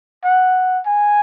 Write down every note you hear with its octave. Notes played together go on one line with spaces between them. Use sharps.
F#5
G#5